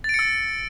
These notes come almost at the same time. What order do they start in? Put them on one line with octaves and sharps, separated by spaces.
A6 D7 C#7 E6